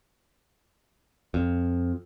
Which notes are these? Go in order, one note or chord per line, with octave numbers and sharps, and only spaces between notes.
F2